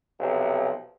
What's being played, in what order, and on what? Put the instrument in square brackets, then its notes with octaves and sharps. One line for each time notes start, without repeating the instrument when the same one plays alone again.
[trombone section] B1 C3 F3